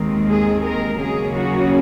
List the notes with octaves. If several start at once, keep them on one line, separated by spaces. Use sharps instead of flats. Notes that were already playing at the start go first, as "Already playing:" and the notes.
Already playing: D#2 D#3 G#3 C4
G#4
A#4
D#2 C#3 F#3 A#3 C#4 G#4
F#4